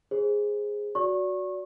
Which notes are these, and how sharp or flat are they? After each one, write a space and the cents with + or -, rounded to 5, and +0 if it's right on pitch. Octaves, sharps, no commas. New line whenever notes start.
G#4 -5 C5 +20
F#4 -5 D5 -30 C#6 -25